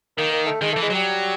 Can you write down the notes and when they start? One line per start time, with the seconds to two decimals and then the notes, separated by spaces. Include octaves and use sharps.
0.17 D#3 A#3
0.32 A#3
0.46 A3
0.61 D#3 G#3
0.73 E3 A3
0.83 G#3
0.90 F#3 G3